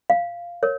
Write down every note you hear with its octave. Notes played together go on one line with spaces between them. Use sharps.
F5
A#4 C#5